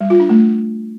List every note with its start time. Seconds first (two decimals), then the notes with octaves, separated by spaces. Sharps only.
0.01 G3
0.10 F4
0.20 D4
0.29 A3